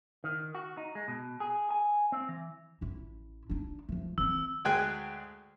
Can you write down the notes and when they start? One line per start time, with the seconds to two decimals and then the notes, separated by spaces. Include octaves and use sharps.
0.24 D#3
0.55 F#4
0.77 D#4
0.95 G#3
1.08 B2
1.40 G#4
1.71 G#5
2.12 C4
2.29 E3
2.81 A1 E4
3.49 D4 D#4
3.89 F3 A3
4.18 E3 C4 E6
4.65 D2 G#3 G#4 G5 G#5 F#6